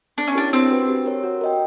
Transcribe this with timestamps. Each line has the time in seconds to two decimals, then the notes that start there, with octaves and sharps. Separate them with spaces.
0.18 B3 D4
0.28 C#4
0.35 D4 E4 G4 A#4 C#5
0.53 C4 D4
0.70 F#4 B4
0.88 G4
1.06 A#4 C#5
1.24 F#4
1.41 A#4 D#5 G5